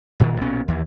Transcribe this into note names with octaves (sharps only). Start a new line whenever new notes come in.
F#1 A#2 D#3 E3
B1 A#2 B3 C#4
D#2 E3